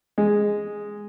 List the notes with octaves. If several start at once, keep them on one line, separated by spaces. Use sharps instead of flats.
G#3